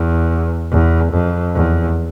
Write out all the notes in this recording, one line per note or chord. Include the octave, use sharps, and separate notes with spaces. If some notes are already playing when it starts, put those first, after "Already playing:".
Already playing: E2
E2
F2
E2